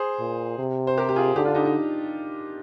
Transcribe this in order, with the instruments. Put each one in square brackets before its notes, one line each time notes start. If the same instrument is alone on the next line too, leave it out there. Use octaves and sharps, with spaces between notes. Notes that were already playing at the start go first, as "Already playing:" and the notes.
Already playing: [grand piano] G#4 C5
[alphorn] A#2
C3
[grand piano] C5
G4 A#4
G4
F4 G#4
[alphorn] D3 [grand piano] D#4 G4
[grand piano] D4 F4
D#4 G4
D#4